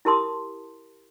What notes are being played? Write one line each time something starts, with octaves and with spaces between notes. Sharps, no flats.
E4 G4 A#4 A5 C6 D#6